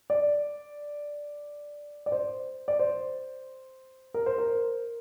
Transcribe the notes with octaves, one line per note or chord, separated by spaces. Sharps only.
D5
D5
C5
D5
C5
A#4
C5
A#4